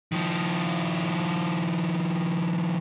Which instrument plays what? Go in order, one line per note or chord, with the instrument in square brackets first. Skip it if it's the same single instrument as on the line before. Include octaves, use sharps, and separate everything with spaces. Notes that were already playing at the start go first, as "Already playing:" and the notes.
[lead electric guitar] D#3 F3